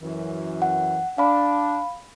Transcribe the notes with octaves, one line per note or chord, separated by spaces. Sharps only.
F#2 E3
F#5
D4 F5 B5